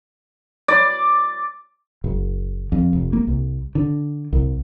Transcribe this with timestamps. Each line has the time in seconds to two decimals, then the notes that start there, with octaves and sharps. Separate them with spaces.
0.68 D5
2.04 F#1
2.72 F2
2.93 F1
3.13 A#3
3.27 C2
3.75 D3
4.33 C2